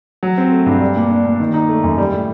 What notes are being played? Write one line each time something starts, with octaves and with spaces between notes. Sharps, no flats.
F#3
C4
A3
G2
G3
A#2
D4
A#2
D#3
D#4
A3
F#2
G3
A2